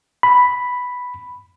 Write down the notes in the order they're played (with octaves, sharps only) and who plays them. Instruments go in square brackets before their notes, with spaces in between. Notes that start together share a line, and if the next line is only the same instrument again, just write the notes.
[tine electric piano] B5